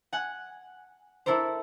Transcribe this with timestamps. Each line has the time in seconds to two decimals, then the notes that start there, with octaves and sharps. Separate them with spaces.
0.13 F#5 G#5 F#6
1.26 D4 E4 A4 A#4 C5